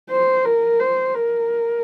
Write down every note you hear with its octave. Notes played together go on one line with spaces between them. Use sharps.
C5
A#4
C5
A#4